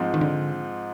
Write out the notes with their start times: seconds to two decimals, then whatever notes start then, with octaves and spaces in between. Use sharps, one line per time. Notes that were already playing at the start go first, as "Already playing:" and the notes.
Already playing: G#2 F3 C4 D#4
0.14 D#3
0.21 D3